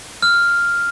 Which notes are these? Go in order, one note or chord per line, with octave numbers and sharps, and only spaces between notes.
F6